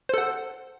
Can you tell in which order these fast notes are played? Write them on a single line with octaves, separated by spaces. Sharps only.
C5 A4 F#5